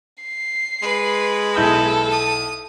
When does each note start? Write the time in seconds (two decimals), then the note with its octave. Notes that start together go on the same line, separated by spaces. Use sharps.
0.23 C7
0.82 G#3 B4
1.56 B1 E4 A4 G6
2.11 D#6